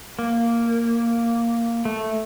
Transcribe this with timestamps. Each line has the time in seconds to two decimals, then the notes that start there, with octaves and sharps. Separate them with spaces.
0.19 A#3
1.85 A3